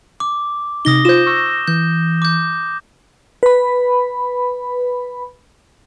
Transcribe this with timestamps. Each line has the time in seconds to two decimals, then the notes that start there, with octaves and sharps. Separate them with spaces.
0.20 D6
0.85 C3 D#4 D#6 A#6 G7
1.05 F4 C5 G6 E7
1.26 C#6 E6 A#6
1.67 E3 G6
2.22 D6 G6
3.43 B4 B5